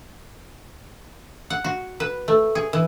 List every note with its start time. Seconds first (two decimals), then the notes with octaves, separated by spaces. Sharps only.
1.50 F#5
1.64 F#4
2.00 B4
2.28 A3
2.55 G#4
2.73 E3